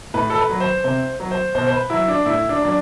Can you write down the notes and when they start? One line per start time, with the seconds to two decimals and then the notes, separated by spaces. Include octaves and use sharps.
0.14 A2 B4
0.30 A4
0.38 B4
0.50 F#3
0.60 C5
0.84 C3 C5
1.20 F#3
1.31 C5
1.55 B2 C5
1.67 C5
1.72 B4
1.90 F#3 E4
2.08 D4
2.25 A2 E4
2.49 D4
2.61 F#3 D4